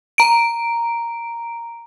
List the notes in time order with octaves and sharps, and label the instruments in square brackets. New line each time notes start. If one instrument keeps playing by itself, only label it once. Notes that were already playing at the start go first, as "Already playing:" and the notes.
[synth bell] A#5 D7